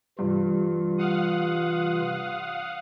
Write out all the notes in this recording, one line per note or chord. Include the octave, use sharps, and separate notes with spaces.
G2 C3 E3 F4
F5 F#5 D#6